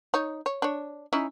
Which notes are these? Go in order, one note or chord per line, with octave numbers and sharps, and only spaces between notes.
D#4 C#5
C#5
D4 C#5
C#4 D#4 E4